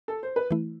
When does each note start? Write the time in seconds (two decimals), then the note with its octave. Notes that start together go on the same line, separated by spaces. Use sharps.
0.08 A4
0.23 C5
0.36 B4
0.51 E3 A3 E4